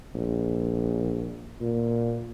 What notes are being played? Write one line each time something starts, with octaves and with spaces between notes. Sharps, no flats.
A#1
A#2